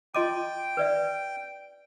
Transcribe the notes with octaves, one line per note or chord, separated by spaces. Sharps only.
F4 D#5 G5 C6 D6 D#7
B4 D5 E5